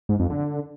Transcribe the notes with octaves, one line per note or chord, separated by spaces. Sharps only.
G#2
F2
D3